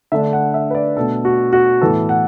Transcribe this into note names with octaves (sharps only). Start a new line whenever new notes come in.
D3 A3 D4 E5
F#5
E5
B4
D5
B2 A3 D4 A4
F#4
F#4
A2 E3 B3 A4
F#5